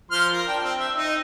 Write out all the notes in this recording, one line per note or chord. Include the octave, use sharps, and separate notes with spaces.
F3 C6 F6
A#4
D4 G5
C4
E5
D#4